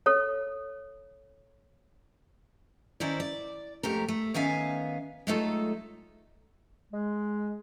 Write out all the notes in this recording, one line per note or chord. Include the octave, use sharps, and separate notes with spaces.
A4 C#5
D#3 C#4 E4 A#4 C5 D5
D5
F2 G#2 A3 G4 A#4
A3
D#3 B3 C#4 E5 F5 G#5
F#3 G#3 A3 D#4 F4 A4
G#3